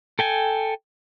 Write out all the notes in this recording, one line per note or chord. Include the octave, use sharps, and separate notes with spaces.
A4 G5 G#5